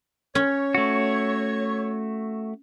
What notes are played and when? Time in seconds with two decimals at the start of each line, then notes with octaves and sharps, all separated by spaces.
0.35 C#4 C#5
0.75 A3 F#4